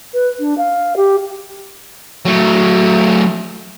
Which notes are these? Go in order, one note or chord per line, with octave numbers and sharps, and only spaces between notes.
B4
D4
F5
G4
F#3 A3